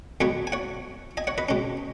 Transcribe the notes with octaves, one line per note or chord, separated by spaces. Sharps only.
B1 B2 G#3 B3 G#4 C#5
G#5
C#5 F#5
D#5 G#5
C#5 F#5
B4 D#5
B2 G#3 C#4